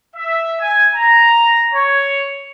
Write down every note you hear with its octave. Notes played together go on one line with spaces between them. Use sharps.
E5
G#5
A#5
C#5